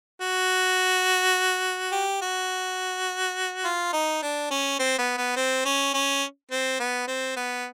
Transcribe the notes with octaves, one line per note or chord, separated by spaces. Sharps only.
F#4
G4
F#4
F4
D#4
D4
C#4
C4
B3
B3
C4
C#4
C#4
C4
B3
C4
B3